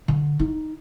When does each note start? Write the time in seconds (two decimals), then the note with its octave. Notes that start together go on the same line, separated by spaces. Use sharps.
0.08 D3
0.39 D#4